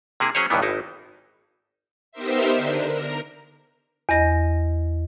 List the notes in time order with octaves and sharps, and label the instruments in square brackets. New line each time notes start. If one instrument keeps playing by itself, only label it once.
[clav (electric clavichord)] C3 A#3 E4 G#4
F#3 C#4 G#4 C5 C#5
C#2 G2 D#3 E3 B3
G#1 D#4 E4
[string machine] B3 D#4 G4 A#4 C5 E5
D3 D4
A#4
[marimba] E2 D#5 A#6